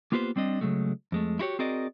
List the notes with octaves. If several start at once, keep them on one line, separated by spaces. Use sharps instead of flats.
A#3 B3 F4 G4 B4 C5
G3 C4 D4 D#5
C#3 E3 F#3 G#3 A3
F2 G#3 A3
E4 F#4 G4 C#5
C4 F#4 G#4 A#4 D5 D#5